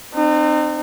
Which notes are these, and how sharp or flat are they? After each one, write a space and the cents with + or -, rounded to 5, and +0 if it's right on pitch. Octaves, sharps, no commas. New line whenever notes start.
C4 +0 D#4 -40